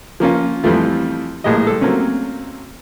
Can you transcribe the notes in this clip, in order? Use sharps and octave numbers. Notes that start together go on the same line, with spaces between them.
F3 A#3 C#4 F4
F2 E3 F3 G3 A3 F4
A#1 A2 G#3 G4 D#5
G3 A4
F#3 A3 A#3 C4 C#4